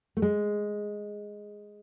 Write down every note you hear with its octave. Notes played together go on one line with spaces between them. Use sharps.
A3
G#3